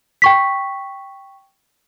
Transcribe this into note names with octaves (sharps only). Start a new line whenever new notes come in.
G5 C#6 B6